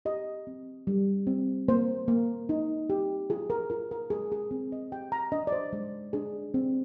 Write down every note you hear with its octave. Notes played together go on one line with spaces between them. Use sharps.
G4 D#5
C4
G3
C4
A#3 C5
A#3
D#4
G4
F4 G#4
A#4
F4 A#4
A#4
G#3 G#4
G#4
C4 G#4
D#5
G4 G5
A#5
D4 D#5
D5
C5
G#3 D5
D4 G#4
C4